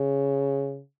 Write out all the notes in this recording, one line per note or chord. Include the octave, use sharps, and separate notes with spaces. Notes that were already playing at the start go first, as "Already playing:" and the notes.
Already playing: C#3